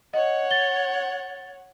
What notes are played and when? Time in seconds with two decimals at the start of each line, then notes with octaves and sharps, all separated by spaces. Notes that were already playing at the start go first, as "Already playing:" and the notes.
0.13 C#5 D#5 F#5
0.51 A6 G7